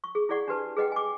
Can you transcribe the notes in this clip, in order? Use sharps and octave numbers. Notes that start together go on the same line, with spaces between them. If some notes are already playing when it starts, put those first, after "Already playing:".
C#6
G#4
E4 G#4 D5 F#5 C#6
D4 G4 B4 A5
G#4 B4 D#5 F#5 G5
G#5 D6